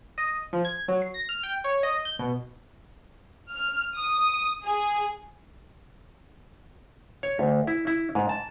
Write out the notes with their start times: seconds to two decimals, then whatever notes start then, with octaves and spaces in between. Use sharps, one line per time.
0.18 D#5
0.53 F3
0.65 G#6
0.88 F#3
1.02 C7
1.14 A#6
1.29 F6
1.43 G5
1.64 C#5
1.83 D#5
2.05 G6
2.19 B2
3.49 F6
3.96 D#6
4.65 G#4
7.23 C#5
7.39 D2
7.67 E4
7.87 E4
8.15 G#2
8.29 A5